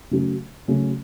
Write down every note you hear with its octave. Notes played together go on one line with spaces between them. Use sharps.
C#3 F#3 A3 C#4
C#3 F#3 A3 C#4